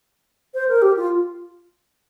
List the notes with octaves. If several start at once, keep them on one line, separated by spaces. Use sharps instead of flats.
C5
A#4
G4
F4